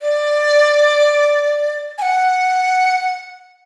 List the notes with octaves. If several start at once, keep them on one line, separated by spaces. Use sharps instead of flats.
D5
G#5
F#5